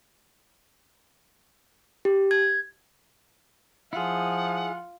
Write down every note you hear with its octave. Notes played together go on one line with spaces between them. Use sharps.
G4
G#6
F3 E4 F4 G#4 F#5